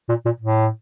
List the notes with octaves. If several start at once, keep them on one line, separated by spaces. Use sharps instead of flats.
A#2
A#2
A2